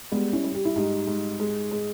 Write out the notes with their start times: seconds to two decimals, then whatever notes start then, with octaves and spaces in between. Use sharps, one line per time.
0.12 G3 G#3 B3
0.33 C#4 E4
0.44 G3
0.54 G4
0.65 E4
0.75 G#2 D#4 G4
1.07 G#2
1.40 G#3
1.71 G#3